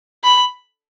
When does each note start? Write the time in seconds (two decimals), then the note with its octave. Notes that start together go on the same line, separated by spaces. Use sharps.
0.24 B5